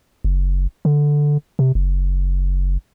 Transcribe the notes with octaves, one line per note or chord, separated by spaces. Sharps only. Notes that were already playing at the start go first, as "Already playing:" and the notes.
F#1
D3
C3
F#1